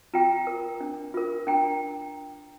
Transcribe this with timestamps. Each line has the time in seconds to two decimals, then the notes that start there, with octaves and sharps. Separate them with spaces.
0.14 F4 G5 A#5
0.47 A#4
0.80 D4
1.14 F4 A#4
1.47 D4 G5 A#5